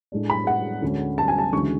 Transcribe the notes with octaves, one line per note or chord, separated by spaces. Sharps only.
A2 G#3 D4
B5
F#5
D2 D3 G#3 C#4
A5
G#5
A5
D2 C#3 E3 G#3 C#6